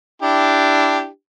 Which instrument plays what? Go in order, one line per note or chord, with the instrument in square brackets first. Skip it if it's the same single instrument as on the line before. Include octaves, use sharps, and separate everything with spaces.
[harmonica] D4 E4 G4